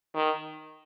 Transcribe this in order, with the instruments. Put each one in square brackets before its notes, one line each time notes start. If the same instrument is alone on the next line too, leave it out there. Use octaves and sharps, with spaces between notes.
[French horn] D#3